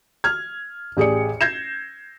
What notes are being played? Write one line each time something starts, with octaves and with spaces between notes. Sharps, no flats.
F6 G#6
A1 G4 G#4 D5 C#7
G6 G#6 A#6 C7 E7